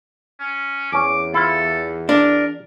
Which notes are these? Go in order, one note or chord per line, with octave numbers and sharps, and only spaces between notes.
C#4
E2 C#4 G#5 D6
E4 F4 A4
D4 A#4